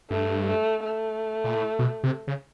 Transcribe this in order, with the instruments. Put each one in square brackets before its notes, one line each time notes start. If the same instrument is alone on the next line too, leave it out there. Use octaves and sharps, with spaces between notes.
[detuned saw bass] G2 [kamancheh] A3
[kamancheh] A3
A3
[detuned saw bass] A#2
A2
B2
C3
C#3